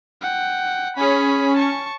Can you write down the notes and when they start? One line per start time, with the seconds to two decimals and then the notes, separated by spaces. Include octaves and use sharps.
0.21 F#5 G5
0.96 C#4 G#4 B5
1.56 A5 C#6